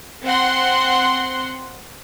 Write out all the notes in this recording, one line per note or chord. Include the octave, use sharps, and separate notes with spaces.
C4 F#5 C6